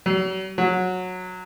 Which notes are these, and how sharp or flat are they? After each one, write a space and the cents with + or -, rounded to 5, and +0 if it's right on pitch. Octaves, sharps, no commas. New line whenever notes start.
F#3 +45
F#3 -10